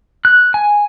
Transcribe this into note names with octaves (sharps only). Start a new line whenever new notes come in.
F#6
G#5